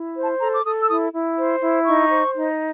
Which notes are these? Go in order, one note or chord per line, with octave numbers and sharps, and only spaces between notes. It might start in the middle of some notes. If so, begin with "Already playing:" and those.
Already playing: E4
C5
A5
A4 A#5
D6
A4 D#6
E6
E4 D#6
E4
C5
E4
D#4 C#6
C5
D#4